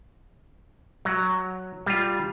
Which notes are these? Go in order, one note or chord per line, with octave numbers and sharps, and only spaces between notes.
F#3
G3 F4